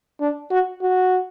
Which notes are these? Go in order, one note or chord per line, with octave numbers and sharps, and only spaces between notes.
D4
F#4
F#4